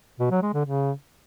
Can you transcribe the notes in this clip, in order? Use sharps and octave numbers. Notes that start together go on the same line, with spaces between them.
B2
F#3
G#3
D3
C#3